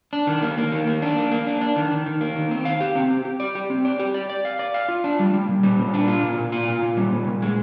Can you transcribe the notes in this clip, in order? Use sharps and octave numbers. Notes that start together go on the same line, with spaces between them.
D4
D#3
A#3
A#3
D#3
A#3
D4
A#3
A#3
D4
D4
D#3
D#3
D#3
A#3
D#3
C4
F5
G4
C4
G4
G4
D5
G4
C4
D5
G4
D5
D5
F5
D5
F5
F4
D4
G3
G3
A#2
G3
A#2
D4
F4
A#2
A#2
F4
A#2
A#2
G3
A#2
A#2
G#3